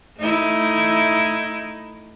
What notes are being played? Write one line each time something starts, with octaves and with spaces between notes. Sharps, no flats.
A3 D#4 E4